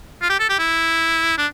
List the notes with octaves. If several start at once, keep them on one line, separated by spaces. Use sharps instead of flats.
F4
G4
A4
G4
E4
D4